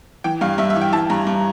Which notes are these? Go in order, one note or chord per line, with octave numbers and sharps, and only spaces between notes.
E3 G5
G2 F5
G2 E5
E5
E3
G5
E3 A5
G2 A#5
G2